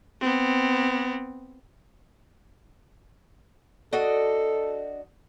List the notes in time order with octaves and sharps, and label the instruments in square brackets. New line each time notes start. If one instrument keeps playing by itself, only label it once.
[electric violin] B3 C4
[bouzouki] D4 F#4 D#5 [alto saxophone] A4